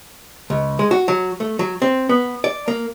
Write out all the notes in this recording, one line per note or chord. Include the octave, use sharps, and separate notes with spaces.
C#2
G#3
F#4
F#3
A3
F#3
C4
B3
D5
A#3